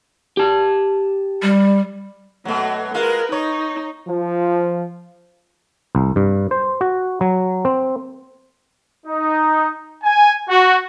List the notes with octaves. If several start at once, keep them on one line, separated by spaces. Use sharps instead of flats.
G4 A5
G3
B2 F#3 A3
G#3 F4 A#4 B4
D#4 C#5
F3
C2
G2
C5
F#4
F#3
C4
D#4
G#5
F#4